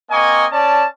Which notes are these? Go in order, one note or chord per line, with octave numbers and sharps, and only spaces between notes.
A#3 C4 D#5 G#5 C#6
C#4 D5 A5